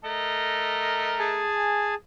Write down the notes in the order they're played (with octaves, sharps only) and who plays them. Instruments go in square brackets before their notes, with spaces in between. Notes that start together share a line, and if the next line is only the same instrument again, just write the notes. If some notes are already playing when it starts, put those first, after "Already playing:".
[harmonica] A3 A#4 D#5
[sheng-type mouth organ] G#4 G#5 A5